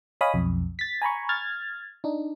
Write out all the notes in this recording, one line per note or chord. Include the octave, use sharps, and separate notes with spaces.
C#5 D#5 F5 G#5 B5 D#6
B1 F2
A6 B6
G#5 A#5 B5 C#6
F6 G#6 A6
D4 D#4